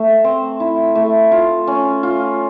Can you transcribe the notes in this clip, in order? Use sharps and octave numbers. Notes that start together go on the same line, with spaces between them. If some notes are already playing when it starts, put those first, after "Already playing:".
Already playing: A3
C4
E4
A3
F4
C#4
F4